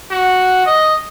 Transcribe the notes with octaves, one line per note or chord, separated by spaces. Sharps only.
F#4
D#5